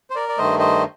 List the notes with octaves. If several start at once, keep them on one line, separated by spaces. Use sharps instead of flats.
C5
A#4 D5
D5
G2 D#3 A3 C5 D#5
C5 D#5